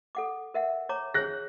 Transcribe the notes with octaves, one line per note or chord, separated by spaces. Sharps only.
A4 F#5 D6
A#4 E5 F#5
C#5 A#5 D6
G#4 C#5 F#6 A#6